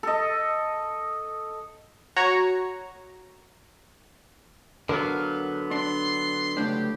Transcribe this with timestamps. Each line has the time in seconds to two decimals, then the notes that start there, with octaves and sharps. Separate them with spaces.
0.03 A4 D#5
2.16 F#4 C#5 A#5
4.89 D3 F#3 B3 A#4 F5
5.71 D4 C6
6.57 C#2 A2 D4 G4